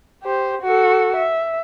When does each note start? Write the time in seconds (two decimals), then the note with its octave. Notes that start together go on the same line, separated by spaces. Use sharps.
0.23 G4 C5
0.62 F#4 A4
1.16 E5